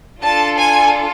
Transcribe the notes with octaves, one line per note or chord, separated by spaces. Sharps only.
D4 F4 A4 A5
G#5